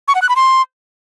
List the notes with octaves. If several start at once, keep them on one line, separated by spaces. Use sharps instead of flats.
C#6
F#5
F#6
B5
C6